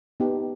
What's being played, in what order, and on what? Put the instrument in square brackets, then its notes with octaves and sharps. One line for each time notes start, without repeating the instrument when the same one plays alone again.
[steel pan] B3 D#4 G4